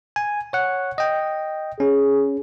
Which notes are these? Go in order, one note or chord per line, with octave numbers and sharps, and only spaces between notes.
G#5
C#5 F#5
D#5 G5
C#4 G#4